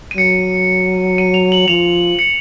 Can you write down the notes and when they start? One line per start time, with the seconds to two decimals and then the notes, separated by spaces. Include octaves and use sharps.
0.11 D#7
0.17 F#3 C#7
1.18 D#7
1.34 F7
1.52 F#7
1.68 F3 F7
2.19 C#7